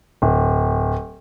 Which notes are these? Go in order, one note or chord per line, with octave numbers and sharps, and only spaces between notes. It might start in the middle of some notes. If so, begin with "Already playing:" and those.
D1